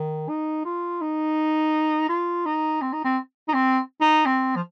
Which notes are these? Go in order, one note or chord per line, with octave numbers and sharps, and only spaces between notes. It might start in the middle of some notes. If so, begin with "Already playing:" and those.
Already playing: D#3
D#4
F4
D#4
F4
D#4
C4
D#4
C4
D#4
C4
D#4
C4
F3